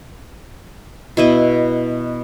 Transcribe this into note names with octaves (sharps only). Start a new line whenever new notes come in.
B2 E4 D#5